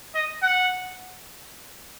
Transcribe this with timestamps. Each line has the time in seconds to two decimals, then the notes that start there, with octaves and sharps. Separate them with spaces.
0.15 D#5
0.43 F#5